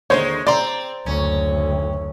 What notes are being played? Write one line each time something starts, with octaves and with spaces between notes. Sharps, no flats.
D#2 D3 D#3 G#3 C5 C#5
C4 C5 D5 A#5 C6
F#1 D2 C#4